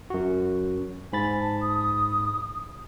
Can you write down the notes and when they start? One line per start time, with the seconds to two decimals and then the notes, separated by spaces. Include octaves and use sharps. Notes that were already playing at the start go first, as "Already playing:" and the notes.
0.10 F#2 F#4
1.13 G#2 G#5 B5 A6
1.41 A5
1.61 D#6